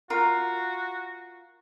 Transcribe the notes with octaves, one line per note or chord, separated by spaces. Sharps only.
F4 F#4 A#4